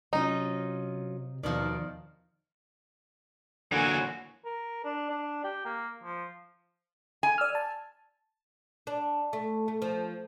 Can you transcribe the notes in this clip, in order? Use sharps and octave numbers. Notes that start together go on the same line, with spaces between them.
C3 F#3 C#4 D#4 F4
D#2 B2 D#3 F3 D5
D3 E3 F#3 A#3 F#4 G#5
A#4
D4
D4
G4
A#3
F3
G#5
D5 E6 F6
A5
D4
A3
A3
F3